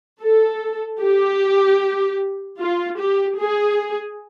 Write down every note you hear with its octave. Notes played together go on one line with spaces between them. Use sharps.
A4
G4
F4
G4
G#4